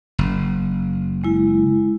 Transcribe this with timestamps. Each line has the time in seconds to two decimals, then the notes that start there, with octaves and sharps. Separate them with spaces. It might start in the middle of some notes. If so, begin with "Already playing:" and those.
0.19 F#1
1.24 G#3 E4